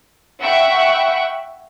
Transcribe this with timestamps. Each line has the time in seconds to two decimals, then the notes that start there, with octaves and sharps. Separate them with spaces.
0.41 E5 F#5 G5 B5 C#6 F#6